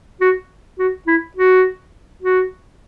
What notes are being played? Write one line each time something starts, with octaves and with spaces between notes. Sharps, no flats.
F#4
F#4
E4
F#4
F#4